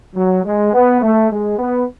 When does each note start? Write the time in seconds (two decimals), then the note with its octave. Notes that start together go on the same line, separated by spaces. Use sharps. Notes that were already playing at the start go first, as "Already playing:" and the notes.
0.15 F#3
0.44 G#3
0.73 B3
1.01 A3
1.30 G#3
1.59 B3